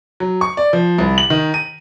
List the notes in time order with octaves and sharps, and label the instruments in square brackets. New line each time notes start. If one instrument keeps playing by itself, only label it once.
[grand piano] F#3
C#6
D5
F3
C2
F#7
D#3
D#7